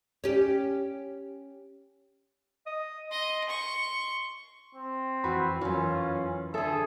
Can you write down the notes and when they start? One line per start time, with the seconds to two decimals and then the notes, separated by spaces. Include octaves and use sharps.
0.24 C#4 G4
2.66 D#5
3.11 D#5 C6
3.49 C#6
4.75 C4
5.24 F2 E3 F#4 B5
5.61 F#2 E3 C#4 F4
6.54 D3 G#4 A4 E5